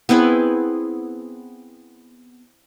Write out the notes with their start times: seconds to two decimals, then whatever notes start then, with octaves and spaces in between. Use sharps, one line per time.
0.09 B3 C4 E4 G#4